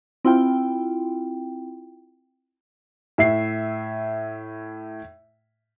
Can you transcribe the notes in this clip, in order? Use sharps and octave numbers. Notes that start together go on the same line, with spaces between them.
C4 E4 F4 G5
A2 E5 C7